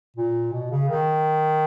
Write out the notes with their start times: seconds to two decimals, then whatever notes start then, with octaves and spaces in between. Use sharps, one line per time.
0.16 A#2
0.53 B2
0.71 C#3
0.89 D#3